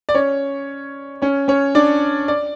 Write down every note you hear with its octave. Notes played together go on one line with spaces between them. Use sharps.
D5
C#4 C#5
C#4 C#5
C#4 C#5
D4 D5
D5